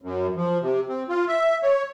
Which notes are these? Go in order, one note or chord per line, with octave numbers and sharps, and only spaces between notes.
F#2
F3
C3
C4
F4
E5
C#5